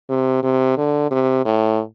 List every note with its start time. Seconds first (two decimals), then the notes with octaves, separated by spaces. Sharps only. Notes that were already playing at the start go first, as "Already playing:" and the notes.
0.09 C3
0.43 C3
0.77 D3
1.11 C3
1.45 A2